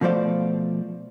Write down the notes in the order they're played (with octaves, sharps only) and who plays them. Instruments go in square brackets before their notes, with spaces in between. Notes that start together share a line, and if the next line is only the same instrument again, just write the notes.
[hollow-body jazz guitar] B2 F3 A3 C5 D5 F5